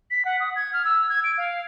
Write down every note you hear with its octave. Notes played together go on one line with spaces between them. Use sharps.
B6
F#5
D#6
G#6
F6
E6
G#6
D7
F5